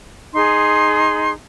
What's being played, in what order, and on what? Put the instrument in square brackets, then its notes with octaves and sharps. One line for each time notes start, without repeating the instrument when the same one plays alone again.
[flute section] D#4 G#4 C6